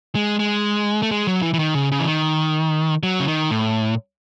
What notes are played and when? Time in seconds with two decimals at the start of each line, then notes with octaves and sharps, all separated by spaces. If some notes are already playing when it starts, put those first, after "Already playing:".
0.15 G#3
0.39 G#3
1.02 A3
1.11 G#3
1.27 F#3
1.42 E3
1.54 E3
1.59 D#3
1.74 C#3
1.92 C#3
2.00 E3
2.07 D#3
3.03 F#3
3.20 C#3
3.28 D#3
3.51 A2